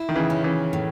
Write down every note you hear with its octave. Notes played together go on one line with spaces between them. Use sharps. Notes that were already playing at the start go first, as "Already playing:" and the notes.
Already playing: E4
D#3
C#3 E3
C#4
C#3 E3
A2